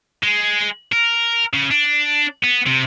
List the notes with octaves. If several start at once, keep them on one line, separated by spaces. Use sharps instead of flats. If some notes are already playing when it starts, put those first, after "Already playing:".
G#3
A#4
C#3
D4
B3
C3